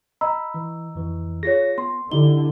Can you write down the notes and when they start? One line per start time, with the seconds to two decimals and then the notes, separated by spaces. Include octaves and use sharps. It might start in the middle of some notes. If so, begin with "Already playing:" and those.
0.21 D#5 A#5 B5 E6
0.54 E3
0.95 F2 E3
1.43 F4 G#4 C#5 A#6
1.78 B3 C6
2.12 D3 D#4 E4 G4 G7